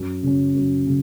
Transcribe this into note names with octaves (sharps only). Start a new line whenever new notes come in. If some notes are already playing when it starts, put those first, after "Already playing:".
Already playing: F#2
C#3 F#3 C#4
F#2
C#3